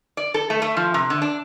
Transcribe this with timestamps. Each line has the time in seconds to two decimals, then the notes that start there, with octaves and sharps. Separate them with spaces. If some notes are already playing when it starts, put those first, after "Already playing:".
0.17 D5
0.34 A4
0.50 A3
0.62 A3
0.77 F3
0.94 C3
1.10 D3
1.22 D4